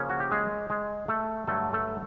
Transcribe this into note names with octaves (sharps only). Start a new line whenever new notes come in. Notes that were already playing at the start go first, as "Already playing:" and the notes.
Already playing: C#3 F3 A#3 C#4 C#5
F#4
G4
G#3 G#4
G#3 G#4
A3 A4
G2 D3 F#3 A3 A4
A3 A4